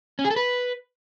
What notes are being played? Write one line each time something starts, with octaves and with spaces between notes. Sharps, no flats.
C#4
G#4
A4
B4